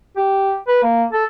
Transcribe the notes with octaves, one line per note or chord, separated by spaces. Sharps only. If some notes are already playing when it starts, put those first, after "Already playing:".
G4
B4
A#3
A4